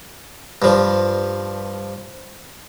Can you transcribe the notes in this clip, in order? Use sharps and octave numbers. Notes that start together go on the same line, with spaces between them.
G2 F3